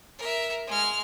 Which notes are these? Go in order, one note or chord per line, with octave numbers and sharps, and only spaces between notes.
A#4 E5
G#3 F6